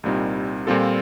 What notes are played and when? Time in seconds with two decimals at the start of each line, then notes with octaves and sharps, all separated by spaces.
0.04 C2 A#2 G3 C4 D#4
0.67 A#2 G3 C4 F4 A4